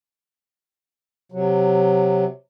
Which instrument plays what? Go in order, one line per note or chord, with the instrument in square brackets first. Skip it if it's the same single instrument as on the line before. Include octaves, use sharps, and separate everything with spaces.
[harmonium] C3 F#3